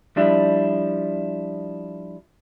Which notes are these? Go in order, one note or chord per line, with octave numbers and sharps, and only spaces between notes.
F3 G3 D4 E4